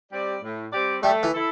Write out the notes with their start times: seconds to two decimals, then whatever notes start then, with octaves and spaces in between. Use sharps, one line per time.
0.12 G3 C4 G4 D5
0.42 A2
0.73 G3 C4 G4 D5
1.02 G3 A3
1.23 E3
1.33 E4 A4